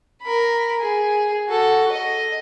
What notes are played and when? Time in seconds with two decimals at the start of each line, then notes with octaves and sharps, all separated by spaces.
0.23 A#4 B5
0.81 G#4
1.48 F#4 A4
1.92 D#5